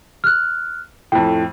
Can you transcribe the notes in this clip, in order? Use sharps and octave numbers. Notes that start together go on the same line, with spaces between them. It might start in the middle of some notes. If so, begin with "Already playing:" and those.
F6 F#6
F2 A2 G5